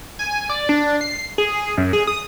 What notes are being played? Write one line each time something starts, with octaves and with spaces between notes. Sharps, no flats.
G#5
D5
D4
C7
G#4
F#2
G#4
D#6